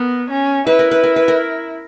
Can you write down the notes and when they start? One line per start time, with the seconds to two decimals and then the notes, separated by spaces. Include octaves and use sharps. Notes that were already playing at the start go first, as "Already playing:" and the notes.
Already playing: B3 A#4
0.30 C#4
0.67 E4 B4
0.79 A#4
0.91 B4
1.03 A#4
1.16 B4
1.28 A#4